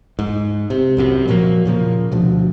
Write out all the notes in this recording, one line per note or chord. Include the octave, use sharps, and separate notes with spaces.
G#2
C3
C2 F#2 C3
A#2 F3 F#3 A#3
A#2 C#3 F3 A#3
D2 B2 F3